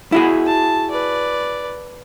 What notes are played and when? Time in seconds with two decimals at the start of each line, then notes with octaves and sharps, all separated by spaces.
0.12 E4 F#4 G#4
0.46 A5
0.91 B4 D5